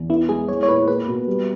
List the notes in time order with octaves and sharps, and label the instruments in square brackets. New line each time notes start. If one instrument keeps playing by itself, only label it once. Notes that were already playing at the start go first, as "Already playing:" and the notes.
Already playing: [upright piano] E2
[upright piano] B3 [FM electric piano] E4
[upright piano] G#3 [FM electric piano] G#4
[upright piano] G#3 [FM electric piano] C#5
[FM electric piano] C#5
[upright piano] A#2 [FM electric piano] B4
[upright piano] A#3 [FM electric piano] B4
[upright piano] B2
G3